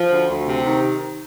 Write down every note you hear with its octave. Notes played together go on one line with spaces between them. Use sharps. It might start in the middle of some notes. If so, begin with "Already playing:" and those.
Already playing: F3
D2
D2
C3
D#3